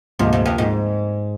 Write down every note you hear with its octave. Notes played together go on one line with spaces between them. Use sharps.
D2 G#2 C3 F3 A#3 F4
G#2
F2
G#2